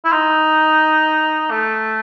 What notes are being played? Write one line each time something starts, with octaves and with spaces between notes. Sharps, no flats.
E4
D#4
A3